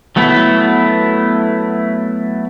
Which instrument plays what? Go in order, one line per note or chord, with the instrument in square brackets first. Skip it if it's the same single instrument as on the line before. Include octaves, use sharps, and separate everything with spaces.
[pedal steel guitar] F#3 A3 B3 E4